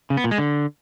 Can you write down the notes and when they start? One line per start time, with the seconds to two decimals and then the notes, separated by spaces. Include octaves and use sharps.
0.10 C#3
0.17 B3
0.24 A#2
0.31 G#3
0.38 D3